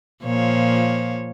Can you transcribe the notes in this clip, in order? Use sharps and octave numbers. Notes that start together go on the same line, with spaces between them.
A#2 F3 C#5